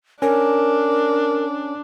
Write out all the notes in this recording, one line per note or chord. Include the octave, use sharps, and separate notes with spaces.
C#4 D4 A#4